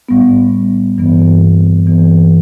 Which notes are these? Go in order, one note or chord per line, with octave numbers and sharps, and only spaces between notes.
A2 G3 B3
G2 E3 B3
G2 E3 B3